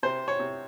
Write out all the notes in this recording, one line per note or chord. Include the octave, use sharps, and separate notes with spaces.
C3 C5
C#5
C3